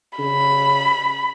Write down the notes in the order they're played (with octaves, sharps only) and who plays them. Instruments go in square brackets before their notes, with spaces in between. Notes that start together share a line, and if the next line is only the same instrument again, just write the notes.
[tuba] C#3 [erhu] B5